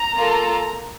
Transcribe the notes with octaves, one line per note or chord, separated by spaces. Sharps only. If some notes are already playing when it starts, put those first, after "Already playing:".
Already playing: A#5
A#3 F4 A4